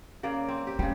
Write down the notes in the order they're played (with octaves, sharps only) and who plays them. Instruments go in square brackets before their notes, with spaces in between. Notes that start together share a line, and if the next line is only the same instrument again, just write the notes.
[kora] C#3 A#3 D5
C4
G4
[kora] C#3 G3 [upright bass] A3